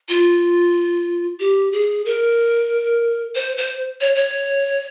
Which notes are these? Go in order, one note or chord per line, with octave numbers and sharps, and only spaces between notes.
F4
G4
G#4
A#4
C5
C5
C#5
C#5